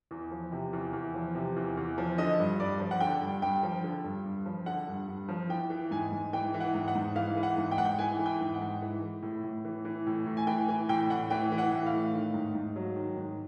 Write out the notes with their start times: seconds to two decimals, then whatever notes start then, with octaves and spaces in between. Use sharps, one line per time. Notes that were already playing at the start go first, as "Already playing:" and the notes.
0.11 E2
0.31 F3
0.52 C3
0.73 E2
0.93 E2
1.14 F3
1.35 C3
1.56 E2
1.77 E2
1.98 F3
2.18 D3 D#5
2.39 G2
2.60 G2 D5
2.80 F3
2.91 F#5
3.00 D3 G5
3.22 G2
3.42 G2 G5
3.63 F3
3.84 D3
4.04 G2
4.25 G2
4.46 F3
4.66 D3 F#5
4.88 G2
5.08 G2
5.29 F3
5.49 E3 G5
5.70 E3
5.91 G#2 G#5
6.11 G#2
6.33 E3 G5
6.54 E3
6.60 F#5
6.74 G#2
6.88 F#5
6.95 G#2
7.15 E3 F5
7.37 E3
7.43 F#5
7.57 G#2
7.71 G5
7.78 G#2 F#5
7.85 G5
7.99 E3 G#5
8.19 E3
8.26 G5
8.41 G#2
8.54 F#5
8.61 G#2
8.82 E3
9.03 E3
9.22 A2
9.44 A2
9.65 E3
9.85 E3
10.07 A2
10.26 A2
10.37 G#5
10.47 E3 G5
10.69 E3 G#5
10.89 A2 G5
11.10 A2 F#5
11.30 E3 G5
11.52 E3
11.58 F#5
11.72 A2
11.86 F5
11.92 A2
12.13 D#3
12.34 G#2
12.55 G#2
12.76 F#3
12.96 D#3
13.17 G#2